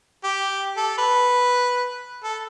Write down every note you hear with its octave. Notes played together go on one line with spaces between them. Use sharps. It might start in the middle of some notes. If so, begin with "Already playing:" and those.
G4
A4
B4
A4